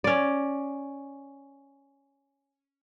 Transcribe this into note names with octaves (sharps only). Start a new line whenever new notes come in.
C#4 D5